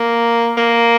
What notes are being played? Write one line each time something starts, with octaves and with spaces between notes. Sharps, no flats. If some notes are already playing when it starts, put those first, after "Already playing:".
Already playing: A#3
A#3